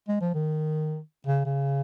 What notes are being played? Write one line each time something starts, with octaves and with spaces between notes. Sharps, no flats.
G#3
F3
D#3
C#3
C#3